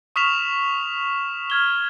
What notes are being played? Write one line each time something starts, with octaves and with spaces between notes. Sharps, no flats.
C#6 D#6 F6 B6 E7 F7
F6 G#6 G7